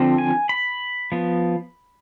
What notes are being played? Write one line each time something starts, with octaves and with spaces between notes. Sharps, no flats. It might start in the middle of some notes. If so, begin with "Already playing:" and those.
Already playing: D3 F3 C4
G#5
B5
F3 B3